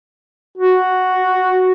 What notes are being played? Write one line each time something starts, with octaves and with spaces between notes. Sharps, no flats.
F#4